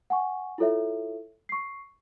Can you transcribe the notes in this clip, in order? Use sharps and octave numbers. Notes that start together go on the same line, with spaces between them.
F#5 G#5 C#6
E4 F4 A4 C#5 E5
C#6 C7